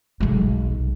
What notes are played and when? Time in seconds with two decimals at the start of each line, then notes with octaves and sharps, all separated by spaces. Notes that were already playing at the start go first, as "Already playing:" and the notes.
0.20 B1 G#3